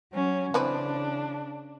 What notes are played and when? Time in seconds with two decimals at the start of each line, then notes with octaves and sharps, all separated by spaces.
0.14 F#3 C#4
0.54 C#3 E3 C4 D4 B4